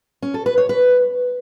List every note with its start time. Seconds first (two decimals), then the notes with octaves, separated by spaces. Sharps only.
0.22 C#4
0.34 A4
0.46 B4
0.58 C#5
0.69 B4